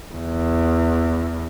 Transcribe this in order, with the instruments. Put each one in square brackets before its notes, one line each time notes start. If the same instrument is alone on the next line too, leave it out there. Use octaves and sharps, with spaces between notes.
[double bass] E2